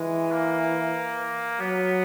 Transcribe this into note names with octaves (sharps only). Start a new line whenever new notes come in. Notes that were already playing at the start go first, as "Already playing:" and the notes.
Already playing: E3 G#3
A#3
F#3 B3